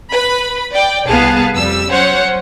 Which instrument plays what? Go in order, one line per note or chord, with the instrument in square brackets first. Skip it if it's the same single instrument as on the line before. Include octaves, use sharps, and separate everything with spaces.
[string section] B4 B5
D5 G5
C2 B3 G#4 F5 A5
F2 G3 E6
F#3 C#4 C5 C#5 F#5